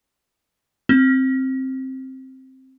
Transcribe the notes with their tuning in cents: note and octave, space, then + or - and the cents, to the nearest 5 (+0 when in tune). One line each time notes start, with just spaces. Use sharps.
C4 +5